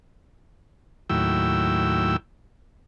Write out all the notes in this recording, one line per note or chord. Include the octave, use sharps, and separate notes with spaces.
D#2 A2 F#3 E4 G5 E6